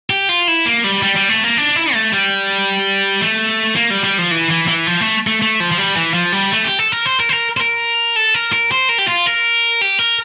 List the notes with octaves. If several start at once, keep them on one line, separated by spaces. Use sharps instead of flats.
G4
F4
E4
A#3
G3
G3
G3
A3
A#3
D4
E4
A3
G3
A3
A#3
G3
G3
F3
E3
E3
E3
F3
A3
A3
A3
F3
F3
G3
E3
F3
G3
A3
G4
A4
A#4
C5
A#4
C5
A#4
C5
A#4
A4
A#4
A#4
C5
A#4
G4
F4
A#4
G4
A#4